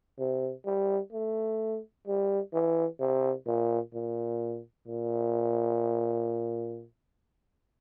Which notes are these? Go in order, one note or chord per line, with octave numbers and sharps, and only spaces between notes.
C3
G3
A3
G3
E3
C3
A#2
A#2
A#2